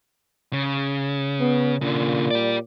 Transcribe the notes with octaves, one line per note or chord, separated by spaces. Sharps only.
C#3
B3
A#2 C#3 D4
G4 D5